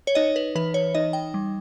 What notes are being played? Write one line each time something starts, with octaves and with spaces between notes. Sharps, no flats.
C#5
D#4 D#5
B4
E3 B4
C#5
D#4 D#5
G5
G3